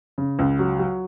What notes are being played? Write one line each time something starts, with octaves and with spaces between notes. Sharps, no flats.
C#3
C#2
F#3
F#3